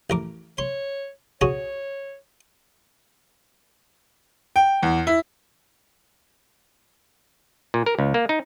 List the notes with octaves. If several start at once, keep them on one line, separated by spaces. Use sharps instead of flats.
A1 A#4 D6
C#5 C6
C#4 F#4 G#4 C#5
G5
E2
E4
A#2
A#4
C#2
A#3
D#4